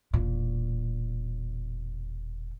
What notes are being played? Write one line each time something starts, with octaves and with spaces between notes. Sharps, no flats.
E1 A#2